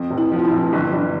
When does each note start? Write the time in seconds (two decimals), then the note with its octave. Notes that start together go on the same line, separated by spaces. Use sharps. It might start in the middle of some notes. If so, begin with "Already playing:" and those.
Already playing: F2
0.10 F1
0.18 E4
0.32 F3
0.39 F4
0.45 E4
0.51 F1
0.73 G1
0.93 G1